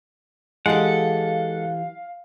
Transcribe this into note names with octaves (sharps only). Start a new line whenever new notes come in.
E3 G#3 G4 A4 F5 F#5